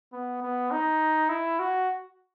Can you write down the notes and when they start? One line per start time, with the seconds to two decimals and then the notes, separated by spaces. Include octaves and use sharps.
0.13 B3
0.42 B3
0.71 D#4
1.29 E4
1.59 F#4